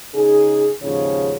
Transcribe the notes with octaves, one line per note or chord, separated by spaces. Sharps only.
C#3 D#4 G#4
D#2 G#2 C#3 F3 C#5